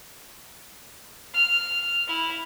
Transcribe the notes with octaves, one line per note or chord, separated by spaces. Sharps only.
F6
E4